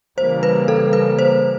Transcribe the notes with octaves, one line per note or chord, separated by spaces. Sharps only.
C#3 E3 G3 A#3 C5
B4
A4
B4
C5